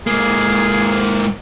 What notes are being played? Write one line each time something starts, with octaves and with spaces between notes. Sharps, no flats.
G#2 A#3 G#4